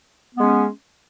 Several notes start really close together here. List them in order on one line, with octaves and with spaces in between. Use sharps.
B3 G#3 C#4